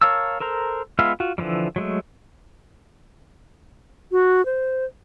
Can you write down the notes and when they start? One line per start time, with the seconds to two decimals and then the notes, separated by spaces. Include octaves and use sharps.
0.01 A#4 C#5 F5 A5 E6
0.40 A4 A#4 C5 A#5
0.99 G#3 B3 F4 E5 F5
1.20 F4 F#4
1.38 D3 E3 F3 G3
1.76 F#3 G#3 A3
4.12 F#4
4.46 C5